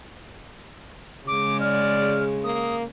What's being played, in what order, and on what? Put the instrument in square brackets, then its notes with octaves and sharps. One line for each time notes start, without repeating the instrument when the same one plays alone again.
[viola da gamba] C#3 G#3 [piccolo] D6
[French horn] D5 [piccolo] F6
[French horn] A#3 [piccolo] D#6